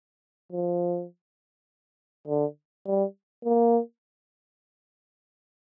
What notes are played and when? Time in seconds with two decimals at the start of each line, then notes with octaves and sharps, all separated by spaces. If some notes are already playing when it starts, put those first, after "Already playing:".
0.52 F3
2.28 D3
2.86 G3
3.45 A#3